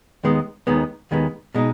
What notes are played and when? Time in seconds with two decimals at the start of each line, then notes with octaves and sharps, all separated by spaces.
0.24 D#2 D#3 G#3 B3
0.67 D#2 D#3 G#3 B3
1.11 D#2 D#3 G#3 B3
1.55 B2 G#3 D#4